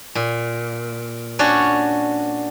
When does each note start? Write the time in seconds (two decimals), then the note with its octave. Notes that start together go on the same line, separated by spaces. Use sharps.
0.15 A#2
1.39 C#4 D4 F#4 C#5